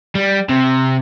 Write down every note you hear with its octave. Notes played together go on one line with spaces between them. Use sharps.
G3
C3